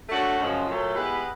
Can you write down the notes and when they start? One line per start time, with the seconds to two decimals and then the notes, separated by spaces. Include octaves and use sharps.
0.09 A3 D4 F#4 A4 C#5
0.38 F#2 C#3 F3 G#3
0.66 A#2 F#3 A3
0.94 G#3 B3 E4 G4 B4